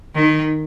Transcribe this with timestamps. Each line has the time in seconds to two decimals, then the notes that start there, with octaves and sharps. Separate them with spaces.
0.14 D#3